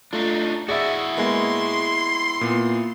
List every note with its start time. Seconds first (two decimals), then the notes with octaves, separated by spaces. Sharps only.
0.13 A3 D4 D#4 F4
0.68 E4 F#4 G#4 D5 E5
1.17 G#3 A#3 B3 C6
2.41 A#2 B3